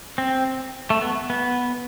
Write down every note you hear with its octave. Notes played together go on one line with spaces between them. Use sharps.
C4
A3
B3
B3